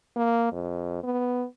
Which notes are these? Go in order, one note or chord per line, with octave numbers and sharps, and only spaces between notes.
A#3
F2
B3